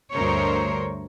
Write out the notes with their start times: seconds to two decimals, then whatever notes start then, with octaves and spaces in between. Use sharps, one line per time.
0.13 D2 G2 A#4 C5 C#5